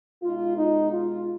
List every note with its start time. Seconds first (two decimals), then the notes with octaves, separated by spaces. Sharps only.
0.23 B2 G#3 D#4 F4
0.58 D#4
0.93 F4